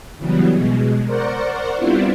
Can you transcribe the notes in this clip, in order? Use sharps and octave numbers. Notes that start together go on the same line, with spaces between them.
C#3 E3 F#3 G3 B3
B2 G#3
A#4 C5 D5 F#5 C#6
G3 B3 C4 D4 E4 F4